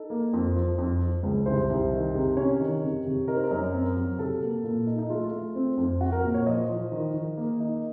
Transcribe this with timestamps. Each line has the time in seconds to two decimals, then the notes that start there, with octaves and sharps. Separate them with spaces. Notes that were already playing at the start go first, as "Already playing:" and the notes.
Already playing: D#4 A4
0.10 A#3
0.33 F2
0.56 F3
0.78 F2
1.01 F3
1.23 C#2
1.46 C2 C5
1.70 C2
1.92 D#3
2.14 C3
2.37 C#4 C#5
2.60 D#3
2.82 C3
3.06 C3
3.28 D#4 A#4
3.36 C5
3.44 A#4
3.51 F#2
3.74 C4
3.96 F#3
4.19 C3 A4
4.42 A#3
4.64 A#2
4.87 D#4
4.98 D#4
5.10 A3 F4
5.32 A3
5.55 C4
5.78 F2
6.01 C4 F#4
6.12 A#4
6.24 A#2
6.34 C#5
6.46 F3 D#5
6.69 F3
6.92 D#3
7.14 D#3
7.37 A#3
7.60 D#4